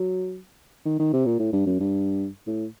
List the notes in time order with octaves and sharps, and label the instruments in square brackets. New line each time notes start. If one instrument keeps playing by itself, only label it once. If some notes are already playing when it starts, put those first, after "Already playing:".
Already playing: [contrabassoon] F#3
D#3
D#3
C3
A#2
A2
G2
F#2
G2
A2